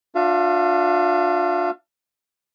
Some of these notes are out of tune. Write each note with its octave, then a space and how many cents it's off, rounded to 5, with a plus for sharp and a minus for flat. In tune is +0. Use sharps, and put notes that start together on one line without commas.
D4 +0 F4 +35 F5 -45